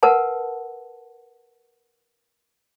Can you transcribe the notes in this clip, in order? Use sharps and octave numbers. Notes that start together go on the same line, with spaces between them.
A#4 B4 F#5 A5